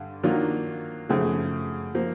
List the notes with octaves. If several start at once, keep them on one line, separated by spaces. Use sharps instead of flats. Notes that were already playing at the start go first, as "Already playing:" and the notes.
Already playing: G2 D3
D#3 F#3 A#3 D4 F4
F#2 C#3 F3 A3
F3 A#3